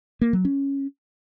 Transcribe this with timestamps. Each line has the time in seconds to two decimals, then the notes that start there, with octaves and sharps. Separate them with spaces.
0.21 A#3
0.33 F#3
0.45 C#4